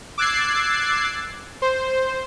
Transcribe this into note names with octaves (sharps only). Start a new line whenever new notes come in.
D6 E6 F#6 G#6 A6 C7
C5